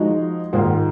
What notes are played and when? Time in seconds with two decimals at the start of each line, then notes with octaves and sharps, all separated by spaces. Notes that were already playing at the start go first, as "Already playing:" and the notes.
Already playing: F3 G#3 D#4 F#4
0.53 G#2 D#3 A#3 F4 G#4